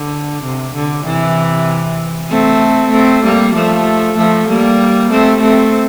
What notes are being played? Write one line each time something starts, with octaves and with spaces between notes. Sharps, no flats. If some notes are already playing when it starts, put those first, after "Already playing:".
Already playing: D3
C3
D3
C3 E3
A3 C4
A3 C4
G3 A#3
F3 A3
F3 A3
G3 A#3
A3 C4
A3 C4